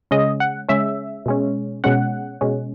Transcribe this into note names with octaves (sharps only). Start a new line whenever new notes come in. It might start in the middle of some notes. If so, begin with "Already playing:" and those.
C#3 G#3 C#4 D#5
F#5
C#3 G#3 C#4 E5
B2 G#3 C#4
B2 G#3 C#4 F#5
B2 G#3 C#4